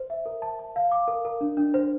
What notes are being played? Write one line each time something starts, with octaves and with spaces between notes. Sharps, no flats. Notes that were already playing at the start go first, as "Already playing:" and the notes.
Already playing: C5
E5
A#4
A5
A5
F5
D6
A#4
A#4
D4
D4
C5